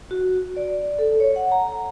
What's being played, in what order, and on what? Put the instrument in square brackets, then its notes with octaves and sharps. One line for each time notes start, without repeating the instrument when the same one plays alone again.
[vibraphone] F#4
D5
A4
C#5
F#5
A#5